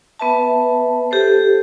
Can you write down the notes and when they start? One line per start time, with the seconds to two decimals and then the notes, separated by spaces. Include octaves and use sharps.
0.19 B3 B4 E5 A5
1.11 G4 A4 C5